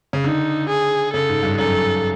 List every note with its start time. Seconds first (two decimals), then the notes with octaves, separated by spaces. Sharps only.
0.13 C#3
0.24 D3 D#4
0.69 G#4
1.14 C#3 A4
1.29 G#2
1.43 G2
1.58 F#2 A4